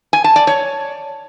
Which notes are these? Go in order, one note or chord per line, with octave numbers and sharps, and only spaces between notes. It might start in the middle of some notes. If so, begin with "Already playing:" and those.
G#5
A5
D5
C#5